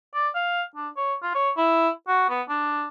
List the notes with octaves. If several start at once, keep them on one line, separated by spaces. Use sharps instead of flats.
D5
F5
D4
C#5
F4
C#5
E4
F#4
B3
D4